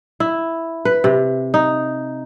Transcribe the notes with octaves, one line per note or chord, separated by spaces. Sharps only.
E4
B4
C3
D#4